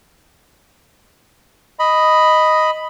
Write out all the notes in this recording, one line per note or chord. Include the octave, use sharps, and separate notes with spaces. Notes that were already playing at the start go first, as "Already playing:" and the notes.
D#5 B5